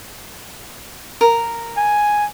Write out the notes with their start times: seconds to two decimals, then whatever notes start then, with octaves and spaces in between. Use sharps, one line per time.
1.21 A#4
1.77 G#5